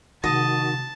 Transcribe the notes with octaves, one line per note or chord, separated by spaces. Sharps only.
C3 D#3 G#3 F#4 D#5 A5